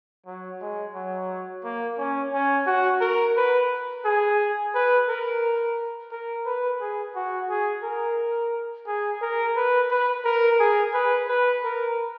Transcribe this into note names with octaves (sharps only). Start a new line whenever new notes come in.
F#3
G#3
F#3
A#3
C#4
C#4
F#4
A#4
B4
G#4
B4
A#4
A#4
B4
G#4
F#4
G#4
A#4
G#4
A#4
B4
B4
A#4
G#4
B4
B4
A#4